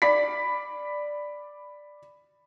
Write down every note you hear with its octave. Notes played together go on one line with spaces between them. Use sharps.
D5 B5 B6